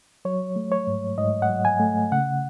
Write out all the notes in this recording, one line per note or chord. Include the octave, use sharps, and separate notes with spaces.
F#3 C#5
A3
C#5
G#2
G#2 D#5
F#5
F#3
G#5
A3
C#3 F#5